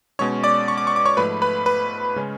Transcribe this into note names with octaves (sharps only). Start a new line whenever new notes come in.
B2 G#3 C#4 C#5 C#6
D5 D6
C#6
D6
C#6
D6
C#5 C#6
G#2 F3 A3 B4 B5
B4 B5
B4 B5
C#3 G#3 C#4